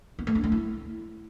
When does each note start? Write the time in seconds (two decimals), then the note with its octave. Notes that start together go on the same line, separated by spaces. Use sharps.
0.19 B3
0.27 A3
0.35 D4
0.44 A3
0.52 E4